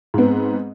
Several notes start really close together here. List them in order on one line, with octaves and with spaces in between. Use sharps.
G#2 B3 C4